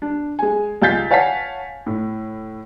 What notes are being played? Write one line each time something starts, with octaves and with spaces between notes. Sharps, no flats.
D4
G#3 G#5
C#2 F5 G#5 G6 A6 B6
C#5 F5 F#5 G#5 A5 B6
A2